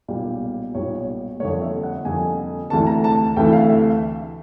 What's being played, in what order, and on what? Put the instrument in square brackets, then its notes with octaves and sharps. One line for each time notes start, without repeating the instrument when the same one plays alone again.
[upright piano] B1 A#2 G3
B1 A#2 G3 C#5
F2 D3 G3 A#3 C#5
E5
F#5
F2 D3 G3 A#3 G#5
D2 C3 E3 A3 A5
A#5
A5
D2 C3 E3 A3 G5
F5
E5